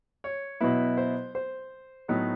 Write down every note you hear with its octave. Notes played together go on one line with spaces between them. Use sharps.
C#5
B2 F#3 B3 E4 B4
C5
C5
A2 F#3 B3 D#4